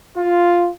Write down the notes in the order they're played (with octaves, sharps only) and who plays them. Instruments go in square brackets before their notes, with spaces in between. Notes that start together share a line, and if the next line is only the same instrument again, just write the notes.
[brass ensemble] F4